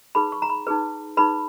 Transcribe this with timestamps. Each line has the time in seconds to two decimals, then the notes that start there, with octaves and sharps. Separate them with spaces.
0.15 D#4 G#4 B4 B5
0.32 C#6
0.42 A#5
0.50 B5
0.67 D#4 G#4 B4
1.17 D#4 G#4 B4 B5